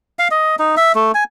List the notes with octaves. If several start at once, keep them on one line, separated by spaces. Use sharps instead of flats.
F5
D#5
D#4
E5
A3
G#5